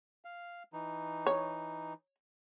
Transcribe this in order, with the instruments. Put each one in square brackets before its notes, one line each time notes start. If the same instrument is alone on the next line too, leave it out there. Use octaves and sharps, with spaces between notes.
[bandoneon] F5
E3 D#4
[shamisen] C#5